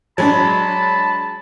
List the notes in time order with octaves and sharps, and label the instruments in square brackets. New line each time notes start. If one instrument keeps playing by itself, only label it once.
[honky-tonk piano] F#3 G#3 D4 [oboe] A5 [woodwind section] B5